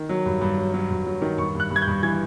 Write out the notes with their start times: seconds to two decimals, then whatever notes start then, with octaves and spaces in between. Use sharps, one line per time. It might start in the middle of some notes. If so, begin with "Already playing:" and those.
Already playing: D#3
0.09 F#3
0.26 G2
0.41 G2
0.58 F#3
0.74 F#3
0.91 G2
1.06 F#3
1.22 D#3
1.38 G2 C#6
1.55 G2 F#6
1.70 G2
1.76 G#6
1.82 G6
1.87 G2
2.03 E3 G#6